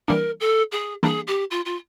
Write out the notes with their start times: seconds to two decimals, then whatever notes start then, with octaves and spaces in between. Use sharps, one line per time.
0.08 E3 G3 A#3 D4 A#4
0.40 A4
0.72 G#4
1.03 E3 G3 A#3 D4 G#4
1.27 G4
1.51 F4
1.65 F4